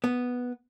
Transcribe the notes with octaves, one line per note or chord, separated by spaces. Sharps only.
B3